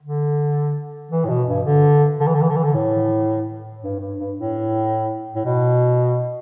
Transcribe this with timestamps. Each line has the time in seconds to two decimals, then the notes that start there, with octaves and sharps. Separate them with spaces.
0.02 D3
1.11 E3
1.25 A2
1.30 B2
1.48 G2
1.66 D3
2.21 D3
2.27 E3
2.35 D3
2.42 E3
2.49 D3
2.56 E3
2.64 D3
2.74 A2
3.83 G2
4.00 G2
4.18 G2
4.37 A2
5.36 A2
5.45 B2